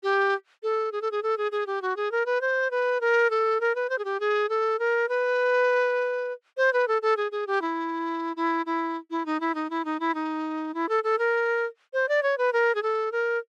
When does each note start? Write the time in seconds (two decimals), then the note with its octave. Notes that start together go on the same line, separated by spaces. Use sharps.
0.03 G4
0.63 A4
0.92 G#4
1.02 A4
1.11 G#4
1.23 A4
1.38 G#4
1.52 G#4
1.67 G4
1.82 F#4
1.97 G#4
2.12 A#4
2.26 B4
2.41 C5
2.71 B4
3.01 A#4
3.30 A4
3.61 A#4
3.75 B4
3.90 C5
3.98 G#4
4.05 G4
4.20 G#4
4.49 A4
4.79 A#4
5.09 B4
6.57 C5
6.73 B4
6.88 A4
7.02 A4
7.17 G#4
7.32 G#4
7.47 G4
7.62 E4
8.36 E4
8.66 E4
9.11 E4
9.26 D#4
9.40 E4
9.55 D#4
9.70 E4
9.85 D#4
10.00 E4
10.15 D#4
10.74 E4
10.89 A4
11.04 A4
11.19 A#4
11.93 C5
12.09 D5
12.23 C#5
12.38 B4
12.53 A#4
12.75 G#4
12.83 A4
13.12 A#4